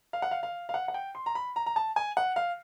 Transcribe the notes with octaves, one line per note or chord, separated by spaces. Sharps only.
F5
F#5
F5
F5
F5
F#5
F#5
G5
C6
A#5
B5
A#5
A#5
A5
G#5
F#5
F5